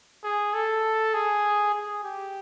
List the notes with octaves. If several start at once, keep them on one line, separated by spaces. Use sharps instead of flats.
G#4
A4
G#4
G#4
G4